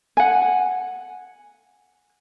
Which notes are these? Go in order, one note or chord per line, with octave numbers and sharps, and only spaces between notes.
F#5 G#5